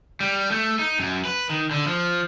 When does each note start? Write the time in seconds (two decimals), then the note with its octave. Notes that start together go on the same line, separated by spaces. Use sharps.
0.20 G3
0.51 A3
0.79 D#4
1.00 F#2
1.25 B4
1.50 D#3
1.71 D3
1.87 F3